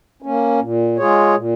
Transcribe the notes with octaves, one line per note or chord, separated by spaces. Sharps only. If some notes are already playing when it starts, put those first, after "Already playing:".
A#3 C#4
A#2
G#3 F4 G#4 C#5
A#2